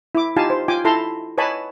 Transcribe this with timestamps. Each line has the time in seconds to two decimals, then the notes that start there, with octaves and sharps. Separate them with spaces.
0.15 E4 D6
0.36 D#4 F4 G4 F5 G#5 A5
0.50 C5
0.68 F4 G5 G#5 D6
0.85 E4 A4 A5 A#5 C6
1.38 B4 C#5 D#5 G#5 A5 B5